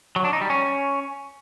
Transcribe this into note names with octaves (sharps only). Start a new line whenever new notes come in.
F#3
D4
D#4
G3
C#4